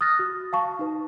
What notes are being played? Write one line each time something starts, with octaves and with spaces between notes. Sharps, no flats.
D#6 F6 F#6 A6 A#6
F#4
F5 A5 C#6
D#4 B4